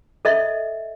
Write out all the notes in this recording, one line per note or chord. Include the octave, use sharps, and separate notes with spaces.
A4 D#5 E5